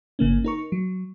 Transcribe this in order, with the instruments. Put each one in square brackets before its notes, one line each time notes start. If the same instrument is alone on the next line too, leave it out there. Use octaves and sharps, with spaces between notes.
[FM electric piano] G1 C#3 A#3 C#4
D#4 A#4 C#6
F#3